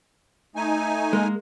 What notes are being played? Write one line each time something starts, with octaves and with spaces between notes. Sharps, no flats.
A3 D#4 G#5
G#3 A#3